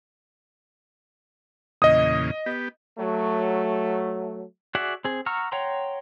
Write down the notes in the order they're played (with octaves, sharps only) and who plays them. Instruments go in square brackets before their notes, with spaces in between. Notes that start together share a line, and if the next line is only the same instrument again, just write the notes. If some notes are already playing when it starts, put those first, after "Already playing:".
[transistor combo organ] E2 A#2 C#3 [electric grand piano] D#5 D#6
[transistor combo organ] B3 G4
[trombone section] F#3 A3
[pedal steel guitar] F#4 G#4 D5 E5 F#5
C4 G#4
F#5 A#5 C#6 E6 F6
C#5 F#5 G5 A#5 C6